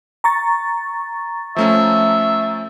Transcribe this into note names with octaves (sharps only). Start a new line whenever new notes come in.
A#5 C#6 A6
F3 A3 C#4 E5